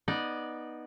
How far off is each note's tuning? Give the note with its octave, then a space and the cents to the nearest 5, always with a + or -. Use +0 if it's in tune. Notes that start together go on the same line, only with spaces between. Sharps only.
B3 -10 D#4 +0 D5 +5